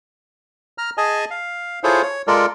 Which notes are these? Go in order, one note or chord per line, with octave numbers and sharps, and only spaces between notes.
A#5 F6
G#4 D#5 G#5 A5
F5
E4 F4 G#4 A4 C5 C#5
C#5
G#3 F4 A4 A#4 D5